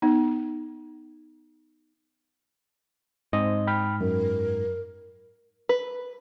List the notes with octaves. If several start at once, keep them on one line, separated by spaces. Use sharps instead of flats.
B3 D#4
G#2 C4 D#5
G5 B5 F6
F#2 A#4
B4